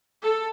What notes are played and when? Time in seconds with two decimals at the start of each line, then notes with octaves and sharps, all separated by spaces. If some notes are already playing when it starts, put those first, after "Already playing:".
0.24 A4